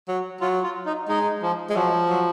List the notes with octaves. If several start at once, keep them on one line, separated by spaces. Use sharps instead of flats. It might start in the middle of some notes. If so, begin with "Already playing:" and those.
F#3
F#3 F4
F4
D#4
G#3 D#4
F3
G#3
F3 F#3
F#3